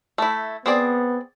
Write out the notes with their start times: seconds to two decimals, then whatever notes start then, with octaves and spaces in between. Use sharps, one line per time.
0.18 A3 E4
0.66 B3 C4 G#4 D5